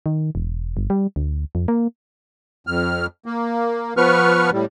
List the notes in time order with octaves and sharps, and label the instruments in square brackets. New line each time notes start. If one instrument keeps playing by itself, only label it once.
[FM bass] D#3
E1
G1
G3
D2
F2
A#3
[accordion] F2 F6
A#3
F3 B3 B4 C#6 F6
A2 G3